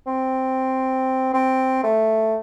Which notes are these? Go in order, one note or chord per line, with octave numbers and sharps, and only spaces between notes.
C4
C4
A3